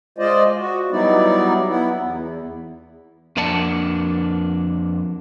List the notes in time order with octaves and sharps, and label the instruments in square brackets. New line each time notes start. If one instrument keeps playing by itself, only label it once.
[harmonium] G#3 F4 C5 D5 D#5
F#4
F#3 G3 B3 D#4 E4 D5
B3 E4
E2
[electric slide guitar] F2 A#3 D4 D5 F#5 A5